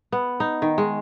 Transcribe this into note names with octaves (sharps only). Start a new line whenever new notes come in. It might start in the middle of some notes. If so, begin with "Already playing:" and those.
B3
D#4
D#3
G#3